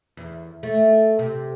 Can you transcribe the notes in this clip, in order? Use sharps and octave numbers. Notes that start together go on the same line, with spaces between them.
E2
A3
C3